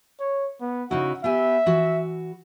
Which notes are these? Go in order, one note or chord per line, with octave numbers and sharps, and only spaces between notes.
C#5
B3
C#3 D#4 E4 F#4
B3 G4 E5 G#5
E3 F#4